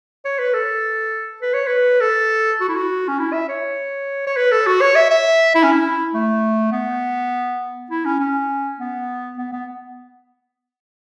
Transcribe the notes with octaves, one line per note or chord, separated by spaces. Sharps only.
C#5
B4
A4
B4
C#5
B4
A4
F#4
E4
F#4
C#4
E4
E5
C#5
C#5
B4
A4
F#4
C#5
E5
E5
E4
C#4
E4
A3
B3
E4
C#4
C#4
B3
B3
B3